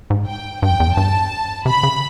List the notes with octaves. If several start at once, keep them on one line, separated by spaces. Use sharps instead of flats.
G#2
G5
G2 G5
F2
E2
F2
G2 A5
C3 B5
C#3